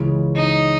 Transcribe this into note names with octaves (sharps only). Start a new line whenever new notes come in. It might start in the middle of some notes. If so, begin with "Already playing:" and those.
Already playing: C#2 C#3 E3 G#3 C#4
D#4